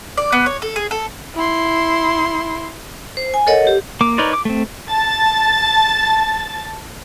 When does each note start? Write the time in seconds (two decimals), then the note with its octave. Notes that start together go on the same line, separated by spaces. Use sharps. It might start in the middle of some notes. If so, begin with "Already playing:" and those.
0.17 D5
0.32 B3
0.46 C#5
0.62 A4
0.76 G#4
0.91 A4
1.35 E4 C6
3.17 C5
3.34 G#5
3.47 A4 A#4 C#5 D#5 F#5
3.67 G4
4.01 A#3 D6
4.18 D#4 A#4 B4 C#5 D5
4.33 D6
4.45 A3 C4
4.89 A5 A6